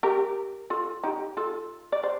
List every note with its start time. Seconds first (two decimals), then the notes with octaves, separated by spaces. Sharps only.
0.03 G4 A#4
0.70 F4 A4
1.04 D#4 G4
1.37 F4 A4
1.92 D5
2.03 C5